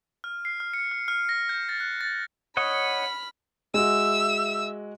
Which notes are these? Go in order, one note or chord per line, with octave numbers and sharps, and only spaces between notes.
F6
C7
F6
C#7
F6
F6
A#6
G6
A6
F#6
A6
C#5 D#5 F#5 B5 F6
G#3 F#4 E5 E6